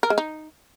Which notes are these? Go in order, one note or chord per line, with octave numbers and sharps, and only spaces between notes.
A#4
G#3
D#4